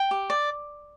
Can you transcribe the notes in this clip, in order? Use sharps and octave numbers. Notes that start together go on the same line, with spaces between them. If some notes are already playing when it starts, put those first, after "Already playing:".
Already playing: G5
G4
D5